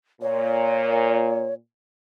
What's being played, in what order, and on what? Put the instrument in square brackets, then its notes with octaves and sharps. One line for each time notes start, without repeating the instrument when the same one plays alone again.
[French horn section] A#2 [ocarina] C#5